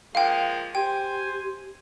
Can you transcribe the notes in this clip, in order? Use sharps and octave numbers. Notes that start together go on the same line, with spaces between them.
F3 G#3 A#3 F5 G5
G4 C5 G5 G#5